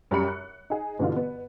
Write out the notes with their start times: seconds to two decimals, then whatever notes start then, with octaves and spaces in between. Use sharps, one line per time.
0.11 F#2 G3 G4 B5 C#7
0.28 F#6
0.70 D#4 G#4
0.99 G2 B2 D3 E3 F4
1.16 B3